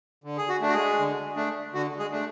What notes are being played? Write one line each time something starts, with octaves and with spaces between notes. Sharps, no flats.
D3
G#4
F#4
A3 D4
F#4
G#3 G#4
D3
A3 D4
D3 F#4
G#3 G#4
A3 D4